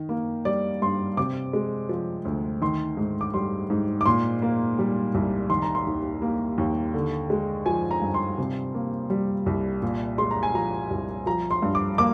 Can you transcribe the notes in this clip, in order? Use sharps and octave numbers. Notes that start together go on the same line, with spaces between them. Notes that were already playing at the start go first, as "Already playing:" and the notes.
Already playing: D#3
A#3
G3 D5
G2 C6
C3 D6
G#3
F3
D2
D#3 C6
G#2
D6
G3 C6
G#2
D6
A#2 C6
A#3
G3
C2
D#3 C6
A#5
C6
D#2
A#3
D#2
D3
G#3
F3 G#5
A#5
G2
C6
C3
A#3
G3
C2
A#2
G#3 C6
A#5
G#5
F3 A#5
C2
F3 A#5
C6
G2
D6
A#3 D6